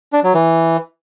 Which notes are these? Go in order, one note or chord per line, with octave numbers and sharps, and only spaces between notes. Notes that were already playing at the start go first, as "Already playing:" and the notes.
D4
F#3
E3